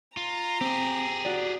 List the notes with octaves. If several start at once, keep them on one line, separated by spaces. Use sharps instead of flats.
F4 A#5
C4 G4 G#4
F#4 D5